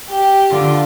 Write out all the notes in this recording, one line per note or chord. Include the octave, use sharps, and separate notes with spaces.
G4
D3 F4